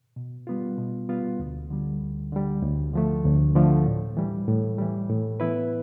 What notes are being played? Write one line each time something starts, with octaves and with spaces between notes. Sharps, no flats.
B2
G3 B3 F4
B2
G3 B3 F4
D2
D3 G3
D2
D3 G3
D2
D3 F3 A3
D2
D3 F3 A3
A2
E3 G3
A2
E3 G3
A2
E3 B3 E4 B4